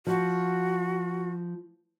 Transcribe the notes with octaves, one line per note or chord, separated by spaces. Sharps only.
F3 F#4